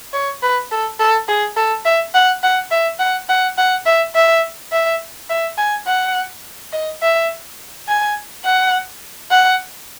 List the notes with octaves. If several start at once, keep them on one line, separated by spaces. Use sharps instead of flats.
C#5
B4
A4
A4
G#4
A4
E5
F#5
F#5
E5
F#5
F#5
F#5
E5
E5
E5
E5
G#5
F#5
D#5
E5
G#5
F#5
F#5